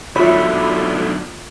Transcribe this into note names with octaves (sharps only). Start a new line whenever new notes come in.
B1 D3 F4 F#4 C#5 E5 B5